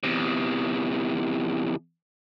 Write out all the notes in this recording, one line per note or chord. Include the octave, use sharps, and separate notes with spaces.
E2 C3